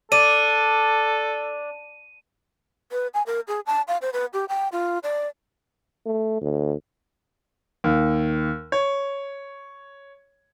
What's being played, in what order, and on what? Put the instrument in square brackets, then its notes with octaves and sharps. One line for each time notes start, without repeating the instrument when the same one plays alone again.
[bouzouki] D4 [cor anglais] A4 [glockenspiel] D#7
[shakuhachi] B4
G#5
A#4
G#4
A5
F5
C5
B4
G4
G5
F4
D5
[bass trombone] A3
D2
[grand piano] D#2
C#5